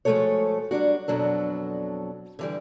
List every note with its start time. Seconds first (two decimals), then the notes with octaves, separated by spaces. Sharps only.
0.05 F3 G#3 A3 F#4 A4 C#5
0.71 F#3 G3 D4 F#4
1.08 F2 B2 F#3 D4 A4
2.39 D3 E3 G3